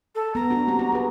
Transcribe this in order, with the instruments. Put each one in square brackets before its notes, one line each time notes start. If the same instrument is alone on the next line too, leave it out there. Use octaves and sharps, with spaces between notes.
[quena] A4
[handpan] B3 [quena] A#5
[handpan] D4 F#4
A#3 C4 G4
F#4
G#4 B4